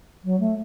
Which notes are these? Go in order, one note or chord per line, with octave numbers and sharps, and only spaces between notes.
F#3
A3